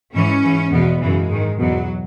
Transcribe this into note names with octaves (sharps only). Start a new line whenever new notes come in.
G#2 E3 C#4
G#2 E3
E2 B2 B3
F#2 C#3 E3 G#3
G#2 D#3
E2 B2 F#3